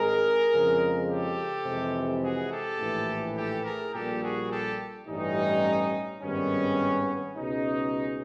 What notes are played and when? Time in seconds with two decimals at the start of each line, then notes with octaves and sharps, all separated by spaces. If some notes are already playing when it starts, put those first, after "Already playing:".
Already playing: G#1 G#2 D#3 G#3 G#4 A#4
0.52 F2 C#3 F3 G#3
1.08 G4 A4
1.65 F2 C3 E3 G#3
2.22 F#4 G#4
2.51 G4 A4
2.79 A#1 A2 E3
3.36 G4 A4
3.65 G#4 A#4
3.93 A#1 A#2 G3 G4 A4
4.22 F#4 G#4
4.51 G4 A4
5.07 A1 G2 E3 G3 C#4 D#4
6.21 G#1 G2 D#3 G3 B3 C#4
7.36 C#2 B2 G#3 C#4 D#4